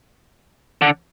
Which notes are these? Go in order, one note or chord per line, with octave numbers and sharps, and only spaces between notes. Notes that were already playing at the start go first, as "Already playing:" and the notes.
D3